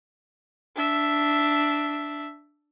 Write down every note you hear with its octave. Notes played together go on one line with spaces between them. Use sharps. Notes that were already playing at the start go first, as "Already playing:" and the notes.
D4 E5